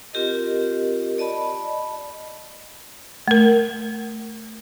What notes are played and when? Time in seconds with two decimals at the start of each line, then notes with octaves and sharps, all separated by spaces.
0.13 C4 F4 G4 A#4 D#5
1.18 D5 D#5 A5 B5
3.28 A3 A#4